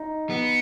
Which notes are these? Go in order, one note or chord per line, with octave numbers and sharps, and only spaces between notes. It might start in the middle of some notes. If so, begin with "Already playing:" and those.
Already playing: D#4
B3